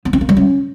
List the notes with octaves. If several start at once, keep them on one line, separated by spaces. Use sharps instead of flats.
B3
C4
A#3
G3
C#4